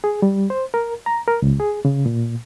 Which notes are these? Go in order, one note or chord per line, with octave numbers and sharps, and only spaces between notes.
G#4
G3
C5
A#4
A#5
A#4
C#2
G#4
C#3
A#2